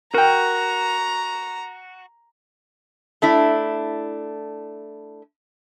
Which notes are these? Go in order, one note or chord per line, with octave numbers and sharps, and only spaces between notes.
F#4 A#4 G5 A#5
A3 D4 E4